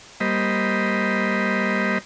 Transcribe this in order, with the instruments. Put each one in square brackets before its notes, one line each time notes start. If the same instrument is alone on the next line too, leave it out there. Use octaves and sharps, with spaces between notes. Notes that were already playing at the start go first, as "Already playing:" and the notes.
[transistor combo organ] G3 A#3 C5 D#5 B5